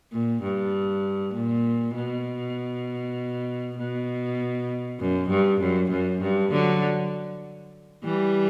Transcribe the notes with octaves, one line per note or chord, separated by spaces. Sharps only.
A#2
G2
A#2
B2
B2
F#2
G2
F#2
F#2
G2
D3 F#3
E3 G3